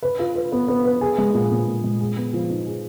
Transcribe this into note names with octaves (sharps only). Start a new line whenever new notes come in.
B4
F4
B4
B3
B3
B4
G#4
G#3
A#2
A#2
A#2
G#3
G#4
B3
F3
D#4
G#4